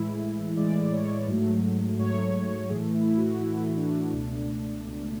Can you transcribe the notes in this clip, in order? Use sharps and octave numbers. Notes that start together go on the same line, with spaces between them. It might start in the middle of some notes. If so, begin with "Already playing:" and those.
Already playing: A2 E3 G#3 E4
A2 E3 G#3 D5
C#5
G#2 F#3 A3
G#2 F#3 A3 C#5
A2 E3 A3 G#4
E4
F#4
A2 E3 A3 E4
D4
C#2 B2 A3
C#2 B2 A3